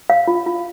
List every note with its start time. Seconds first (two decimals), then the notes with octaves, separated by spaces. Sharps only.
0.10 F5
0.28 F4
0.46 F4